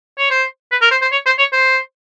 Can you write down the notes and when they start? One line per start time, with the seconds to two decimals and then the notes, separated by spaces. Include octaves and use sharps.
0.18 C#5
0.31 C5
0.71 B4
0.81 A#4
0.91 C5
1.02 C5
1.12 C#5
1.26 C5
1.38 C#5
1.53 C5